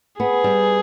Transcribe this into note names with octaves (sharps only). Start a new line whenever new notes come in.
B3 G#4
G3